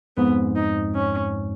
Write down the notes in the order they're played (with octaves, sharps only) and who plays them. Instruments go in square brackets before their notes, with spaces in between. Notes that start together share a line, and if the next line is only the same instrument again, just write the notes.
[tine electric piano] F2 G#2 [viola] B3
[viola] D#4
C#4